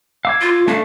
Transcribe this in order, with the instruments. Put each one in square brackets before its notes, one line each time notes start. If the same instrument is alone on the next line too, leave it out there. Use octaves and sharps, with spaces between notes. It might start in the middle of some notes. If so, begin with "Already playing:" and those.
[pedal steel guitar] F5 D6 [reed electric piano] E6 G#6
[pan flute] F4
[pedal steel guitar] A3 D4 [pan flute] F5